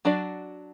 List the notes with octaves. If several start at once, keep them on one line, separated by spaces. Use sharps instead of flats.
F#3 D4 F#4 D5